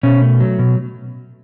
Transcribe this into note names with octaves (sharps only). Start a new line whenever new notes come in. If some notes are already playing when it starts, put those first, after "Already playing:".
B2 C#4
A3
F#3
B2